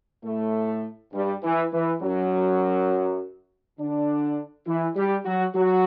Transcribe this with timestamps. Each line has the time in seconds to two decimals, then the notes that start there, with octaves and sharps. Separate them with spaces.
0.24 A2 A3
1.13 G2 G3
1.43 E3
1.73 E3
2.01 F#2 F#3
3.79 D3 D4
4.67 E3 E4
4.96 G3 G4
5.25 F#3 F#4
5.55 F#3 F#4